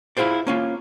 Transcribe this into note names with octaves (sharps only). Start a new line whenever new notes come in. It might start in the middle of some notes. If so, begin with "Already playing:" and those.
E4 F4 G#4 C5 D5
A#3 C#4 F4